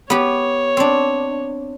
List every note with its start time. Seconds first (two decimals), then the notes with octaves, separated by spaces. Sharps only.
0.10 B3 G4 C#5
0.77 C4 D4